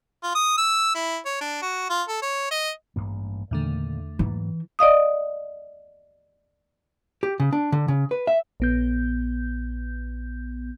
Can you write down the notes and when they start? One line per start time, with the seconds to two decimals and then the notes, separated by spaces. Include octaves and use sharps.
0.23 F4
0.35 D#6
0.58 E6
0.95 E4
1.25 C#5
1.41 D4
1.62 F#4
1.90 F4
2.08 A4
2.22 C#5
2.51 D#5
2.96 A1 G2 A#3
3.51 E2 A#2 D3 D#3 A3
4.19 G#2 E3 F#3 A#3
4.79 D5 D#5 F5 D#6
7.23 G4
7.40 C#3
7.53 D4
7.72 D3
7.88 C#3
8.11 B4
8.27 E5
8.60 A#1 B3 G6